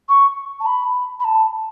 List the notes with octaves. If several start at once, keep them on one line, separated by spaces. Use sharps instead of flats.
C#6
A5
B5
B5
A5